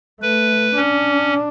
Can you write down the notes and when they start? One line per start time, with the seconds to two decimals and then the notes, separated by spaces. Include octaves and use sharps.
0.21 A3 B4
0.76 C#4 D4